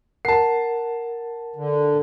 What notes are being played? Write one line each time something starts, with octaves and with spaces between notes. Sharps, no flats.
A#4 F#5 A5 C7
D3